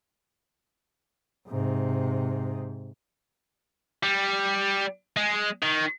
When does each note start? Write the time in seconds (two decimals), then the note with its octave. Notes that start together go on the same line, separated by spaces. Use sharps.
1.48 G#2 C3
4.03 G3
5.17 G#3
5.62 D#3